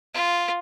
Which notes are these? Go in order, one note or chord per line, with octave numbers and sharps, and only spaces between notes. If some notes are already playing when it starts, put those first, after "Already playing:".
F4